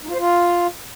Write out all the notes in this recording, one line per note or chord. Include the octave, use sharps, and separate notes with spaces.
D#4
F4
C5
F4